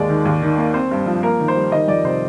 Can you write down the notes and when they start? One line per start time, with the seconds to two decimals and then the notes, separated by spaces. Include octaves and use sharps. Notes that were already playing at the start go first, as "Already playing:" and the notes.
Already playing: D#2 G#3 D5
0.09 D#3
0.25 D#2
0.42 D#3
0.58 A#3
0.74 C4 C5
0.91 G2
1.06 F3
1.23 A#3 A#4
1.40 D#3
1.48 C5
1.56 G3
1.72 D#3 D#5
1.88 F2 D5
2.04 C3 C5